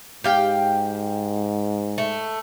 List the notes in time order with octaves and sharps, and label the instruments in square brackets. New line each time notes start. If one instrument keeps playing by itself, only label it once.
[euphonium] G#2 [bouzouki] G4 F5 G5
[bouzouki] A3